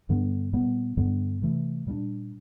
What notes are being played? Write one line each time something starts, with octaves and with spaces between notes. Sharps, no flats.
G2 D3 G3 B3
A#2 G3 B3
G2 D3 G3 B3
C3 E3 A3
A#2 G3 B3 D4